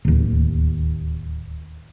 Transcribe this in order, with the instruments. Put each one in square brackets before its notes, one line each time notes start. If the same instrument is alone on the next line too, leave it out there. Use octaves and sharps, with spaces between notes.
[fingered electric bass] D1 D#2